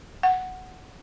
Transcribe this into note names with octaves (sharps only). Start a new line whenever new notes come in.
F#5